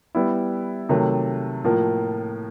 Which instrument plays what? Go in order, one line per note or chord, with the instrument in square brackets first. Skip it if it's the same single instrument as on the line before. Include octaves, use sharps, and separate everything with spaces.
[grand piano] G3 B3 E4
C3 D#3 F#3 A3
A2 F3 A#3